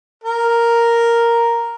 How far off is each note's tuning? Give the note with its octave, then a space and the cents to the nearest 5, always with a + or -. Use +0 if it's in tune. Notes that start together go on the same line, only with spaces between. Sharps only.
A#4 +0